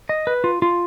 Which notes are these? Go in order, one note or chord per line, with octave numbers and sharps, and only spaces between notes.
D#5
B4
F4
F4